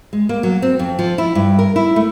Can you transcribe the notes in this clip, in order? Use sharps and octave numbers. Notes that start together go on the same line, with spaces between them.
G#3
A#3
F#3
C4
F2
F3
E4
G2
A#4
E4
A3